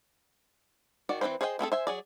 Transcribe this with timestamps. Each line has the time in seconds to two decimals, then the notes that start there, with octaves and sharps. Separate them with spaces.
1.09 D#3 F#4 D5
1.21 E3 F3 C4 B4 C5
1.41 G#4 C5 D#5 F#5 G5
1.59 A3 C4 G#4 A4
1.72 C5 E5 G#5
1.87 F#3 G#4 D5